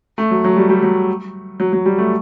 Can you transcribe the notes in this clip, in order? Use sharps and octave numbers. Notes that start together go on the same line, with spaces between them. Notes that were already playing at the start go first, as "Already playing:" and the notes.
A3
F#3
F#3
G3
G3
F#3
F#3
F#3
G3
A3